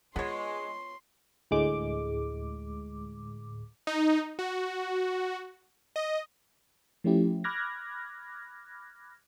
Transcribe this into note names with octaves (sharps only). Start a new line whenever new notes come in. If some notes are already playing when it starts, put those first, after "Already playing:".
G#3 B3 F4 C#5 C6
D2 A2 G#3 D6
D#4
F#4
D#5
F3 A3 C#4 E4 G4
B5 D6 F6 F#6 G#6 A#6